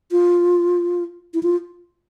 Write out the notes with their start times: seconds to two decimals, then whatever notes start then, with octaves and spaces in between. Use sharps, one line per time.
0.11 F4
1.34 E4
1.43 F4